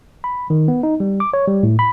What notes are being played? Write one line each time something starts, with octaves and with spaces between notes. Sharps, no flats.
B5
D#3
B3
D#4
G3
D6
C#5
G3
A2
B5